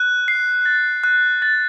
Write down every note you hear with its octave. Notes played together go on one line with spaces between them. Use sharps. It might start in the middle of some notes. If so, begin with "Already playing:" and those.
Already playing: F#6
C7
A6
F#6
A6